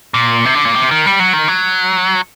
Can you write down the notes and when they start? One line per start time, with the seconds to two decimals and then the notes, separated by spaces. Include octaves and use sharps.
0.14 A#2
0.45 C3
0.55 D3
0.65 A#2
0.75 C3
0.91 D#3
1.06 G3
1.20 F#3
1.33 D#3
1.48 F#3